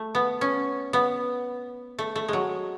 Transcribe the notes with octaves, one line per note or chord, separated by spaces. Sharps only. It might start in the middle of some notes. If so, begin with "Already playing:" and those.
Already playing: A3
B3
C#4
B3
A3
A3
F#3 G#3